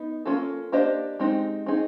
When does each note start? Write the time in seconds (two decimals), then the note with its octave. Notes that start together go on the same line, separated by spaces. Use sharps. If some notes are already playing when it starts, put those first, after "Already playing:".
Already playing: B3 D#4
0.26 A#3 C#4 F4 A4
0.72 A#3 D4 G4 C5 D#5
1.19 G#3 C4 D#4 G4
1.66 C4 D#4 G#4